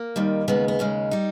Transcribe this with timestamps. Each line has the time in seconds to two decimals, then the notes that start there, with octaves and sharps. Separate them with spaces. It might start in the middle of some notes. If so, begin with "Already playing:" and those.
Already playing: A#3
0.16 D#2 D#3 G3
0.48 D#2 C#3 G#3 B3
0.68 B3
0.79 D#2 C#3 G#3 C#4
1.11 G3 D#4